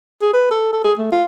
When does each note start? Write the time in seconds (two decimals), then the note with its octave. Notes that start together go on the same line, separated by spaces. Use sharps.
0.22 G#4
0.33 B4
0.51 A4
0.73 A4
0.84 G#4
0.99 A3
1.12 F4